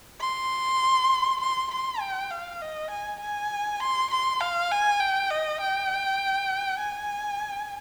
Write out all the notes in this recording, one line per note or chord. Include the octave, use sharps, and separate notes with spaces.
C6
C6
C6
G5
F5
D#5
G#5
G#5
C6
C6
F5
G#5
G5
D#5
G5
G#5